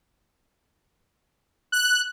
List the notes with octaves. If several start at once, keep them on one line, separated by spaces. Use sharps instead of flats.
F#6